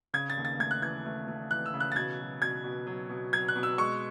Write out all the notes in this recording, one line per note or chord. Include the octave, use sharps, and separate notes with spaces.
C#3 G#6
A6
D#2
A6
A3 G#6
F#6
E3 G#6
A3
A3
E3 F#6
E6
C#3
F#6
A6
B2 G#6
F#3
B2 G#6
B2
F#3
B2
F#3 G#6
F#6
B2
E6
G#3 C#6